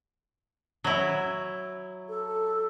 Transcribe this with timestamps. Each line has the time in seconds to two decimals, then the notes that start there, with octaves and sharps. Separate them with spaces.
0.84 F#3 E4
2.09 A4